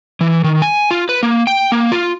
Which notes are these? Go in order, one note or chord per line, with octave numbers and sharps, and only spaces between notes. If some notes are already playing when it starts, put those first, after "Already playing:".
E3
D#3
G#5
F4
B4
A#3
G5
A#3
F4